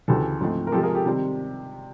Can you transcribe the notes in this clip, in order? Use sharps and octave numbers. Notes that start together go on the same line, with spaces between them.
D2 C#3 E3 G4 A4
G#2 F3 A3 C4
A#4
C3 F3 G#3 G4 A4
G#4 A#4
G4 A4
C3 D#3 G3 C4